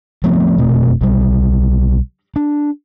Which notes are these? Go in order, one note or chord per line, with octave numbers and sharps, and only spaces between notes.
F3 A3 B3 C4
F1 B2 A3 C4
B1 G3
D4